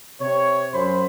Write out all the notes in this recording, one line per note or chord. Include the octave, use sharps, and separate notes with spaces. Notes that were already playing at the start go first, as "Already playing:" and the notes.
C3 C#5
F#2 C5 B5 C6